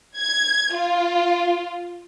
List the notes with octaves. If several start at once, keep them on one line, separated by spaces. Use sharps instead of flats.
G#6
F4